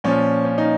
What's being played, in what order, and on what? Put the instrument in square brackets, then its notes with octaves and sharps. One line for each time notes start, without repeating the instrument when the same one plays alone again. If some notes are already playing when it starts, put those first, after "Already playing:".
[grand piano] A#2 F3 C#4
C#4
D#4